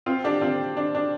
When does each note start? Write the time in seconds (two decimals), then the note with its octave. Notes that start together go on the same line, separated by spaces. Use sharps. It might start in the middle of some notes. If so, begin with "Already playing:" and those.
0.06 C4 F4
0.24 D4 G4
0.41 C4 F4
0.77 D4
0.95 D4